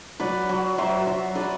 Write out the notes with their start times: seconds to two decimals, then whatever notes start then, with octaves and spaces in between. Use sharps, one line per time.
0.20 F#3 B4 D5
0.49 F#3
0.78 F#3 C5 E5
1.07 F#3
1.35 F#3 B4 D5